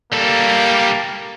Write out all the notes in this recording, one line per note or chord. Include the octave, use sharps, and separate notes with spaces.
G3 A#3 A4